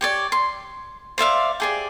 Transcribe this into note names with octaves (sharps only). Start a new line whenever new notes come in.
G4 C#5 D5
C6
C5 D5 E5 F5
G4 G#4 D5